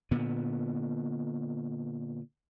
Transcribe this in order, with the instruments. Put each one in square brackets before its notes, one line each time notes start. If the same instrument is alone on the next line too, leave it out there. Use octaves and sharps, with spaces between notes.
[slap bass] A#2 D3 B3